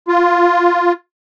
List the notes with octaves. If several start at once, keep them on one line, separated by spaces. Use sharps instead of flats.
F4